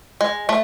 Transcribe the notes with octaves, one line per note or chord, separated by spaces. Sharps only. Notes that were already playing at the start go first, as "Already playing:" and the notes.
G#3
A3